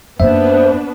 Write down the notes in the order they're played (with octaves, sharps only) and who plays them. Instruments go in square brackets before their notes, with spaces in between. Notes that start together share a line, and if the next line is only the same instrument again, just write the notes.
[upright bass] F#2 A#3 [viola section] B3 D4 B4 [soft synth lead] C5 [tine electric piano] E5